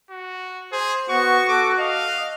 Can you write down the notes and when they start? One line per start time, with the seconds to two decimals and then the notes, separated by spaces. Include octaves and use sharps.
0.10 F#4
0.72 G#4 C5
1.10 B3 F#4 C#6
1.49 A4 D6
1.79 D#5 F5